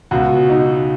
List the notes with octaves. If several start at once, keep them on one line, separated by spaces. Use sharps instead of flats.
C#2 B2 F#4
D#4